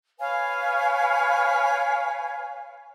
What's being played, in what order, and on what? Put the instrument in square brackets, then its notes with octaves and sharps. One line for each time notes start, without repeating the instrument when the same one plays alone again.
[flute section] B4 C#5 F5 G#5